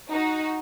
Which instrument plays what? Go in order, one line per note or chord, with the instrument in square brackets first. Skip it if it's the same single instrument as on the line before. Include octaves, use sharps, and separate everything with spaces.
[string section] D#4 F#4